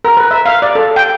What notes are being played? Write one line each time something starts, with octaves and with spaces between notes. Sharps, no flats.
A#4
B4
E5
F5
D5
A4
G5